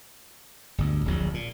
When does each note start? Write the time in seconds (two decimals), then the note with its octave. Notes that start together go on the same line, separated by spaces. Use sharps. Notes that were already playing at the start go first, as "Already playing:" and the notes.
0.78 G1 D2
1.05 D1 A#1
1.34 A#2